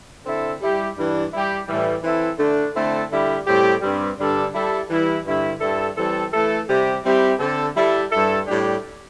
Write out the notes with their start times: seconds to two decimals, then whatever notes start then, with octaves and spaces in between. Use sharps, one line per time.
0.25 D3 C4 E4 A4
0.60 G3 E4 G4
0.97 G2 E3 G3 D4
1.32 G3 E4 G4
1.67 A2 E3 G3
2.03 E3 C4 E4 A4
2.39 D3 A3 D4
2.75 D3 A3 C4 E4 A4
3.10 D3 G3 E4 G4
3.46 A2 G3 C4 G4
3.82 G2 G3 C4
4.18 G2 D3 G3 D4 A4
4.54 G3 E4 A4
4.89 E3 G3 E4
5.25 G2 D3 G3 E4
5.61 G2 G3 E4 A4
5.96 E3 G3 C4 A4
6.33 E3 A3 E4 A4
6.68 C3 G3 E4 G4
7.04 G3 C4 E4 G4
7.39 D3 C4 A4
7.75 G3 E4 A4
8.11 G2 G3 E4 A4
8.47 A2 G3 D4 G4